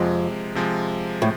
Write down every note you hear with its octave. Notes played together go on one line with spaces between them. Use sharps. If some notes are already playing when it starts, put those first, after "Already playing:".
Already playing: F2 C3 F3 G#3
C3 F3 G#3
A2